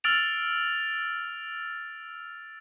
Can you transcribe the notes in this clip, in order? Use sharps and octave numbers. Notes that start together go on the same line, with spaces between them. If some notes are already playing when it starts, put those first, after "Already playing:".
E6 F6 A6 D7 F7